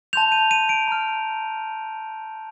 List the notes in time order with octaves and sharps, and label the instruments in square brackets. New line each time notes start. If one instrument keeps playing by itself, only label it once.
[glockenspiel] A5 C6 G6 F7
D#7
D#7
D7
A#5 F6